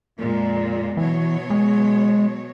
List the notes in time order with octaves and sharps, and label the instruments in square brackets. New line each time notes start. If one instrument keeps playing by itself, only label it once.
[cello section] F2 A#2 G#3
[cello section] B2 F#3 C#5 [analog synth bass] E3
[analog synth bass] G#3